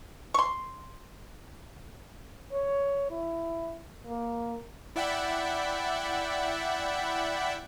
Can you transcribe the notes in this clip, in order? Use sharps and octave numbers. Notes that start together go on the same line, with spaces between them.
C6 C#6
C#5
E4
A#3
E4 D5 E5 F#5 G5 B5